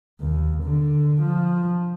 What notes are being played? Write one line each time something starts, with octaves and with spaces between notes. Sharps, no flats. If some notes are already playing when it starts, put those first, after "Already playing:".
D#2
D3
F3